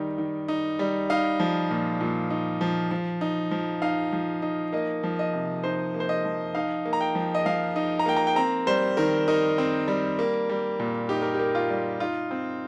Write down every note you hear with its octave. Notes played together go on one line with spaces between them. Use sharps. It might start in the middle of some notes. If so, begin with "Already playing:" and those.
Already playing: D#3 G3 D#4
D#3
D#4
G3
D#4 F5
F3
A#2
A#2
D#4
F3
F3
D#4
F3
D#4 F5
F3
D#4
A#3 D#5
F3
D#5
C3
D#4 C5
A#3
C5
D#5
F3
D#4 F5
A#3
A#5
G5
F3
D#5
F3 F5
D#4
A#5
A#3 G5
A#5
G5
C4 A#5
G3 C5
D#3 A#4
D#4 A#4
C4
G3
A#3
G3
A#2
D#4 G4
A#4
A#3 G4
F4
G3
D#4 F4
C4